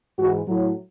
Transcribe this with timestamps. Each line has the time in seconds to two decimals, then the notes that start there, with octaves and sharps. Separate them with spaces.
0.18 G#2 E3 F#4
0.47 A2 F#3